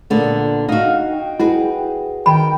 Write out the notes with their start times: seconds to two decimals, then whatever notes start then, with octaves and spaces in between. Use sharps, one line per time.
0.10 A#2 D3 B3
0.69 D#4 F#4 D#5 F5
1.09 G5
1.40 E4 F#4 G#4 B4
2.26 D#3 G5 B5